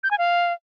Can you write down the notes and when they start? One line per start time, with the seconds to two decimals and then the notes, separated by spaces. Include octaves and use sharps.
0.03 G6
0.11 G#5
0.18 F5